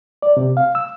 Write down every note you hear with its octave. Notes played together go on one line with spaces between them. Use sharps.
D5
C3
F5
E6